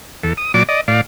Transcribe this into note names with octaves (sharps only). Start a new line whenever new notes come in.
E2 A4
D#6
A#2 F#3 D5 D6
D5 D#5
A2 D5 F5